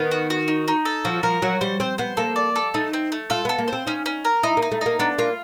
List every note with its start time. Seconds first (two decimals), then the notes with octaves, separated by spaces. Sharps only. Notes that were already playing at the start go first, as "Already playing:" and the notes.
Already playing: D#3 B3
0.11 F#4
0.30 F#4
0.48 D#4
0.68 D#4
0.85 A4
1.05 F3 F#4
1.23 F3 A#4
1.42 F#3 F#4
1.61 G3 C5
1.80 C4 C5
1.98 B3 C5
2.17 A#3 A4
2.36 D5
2.56 A4
2.74 A3 D#4
2.93 C4
3.12 A3
3.30 F4 A4
3.45 B3 A4
3.58 A#3
3.68 C5
3.73 C4
3.87 C#4 D#4
4.06 C#4
4.25 A#4
4.43 D#4 E4
4.57 A#3
4.62 D#4
4.72 A3
4.81 A#3 D#4
4.99 B3 D4
5.18 A#3 F4